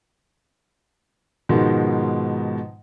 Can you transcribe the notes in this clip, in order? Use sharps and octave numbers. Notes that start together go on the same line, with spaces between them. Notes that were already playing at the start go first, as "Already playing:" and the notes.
G#2 B2 D#3 F3 G#3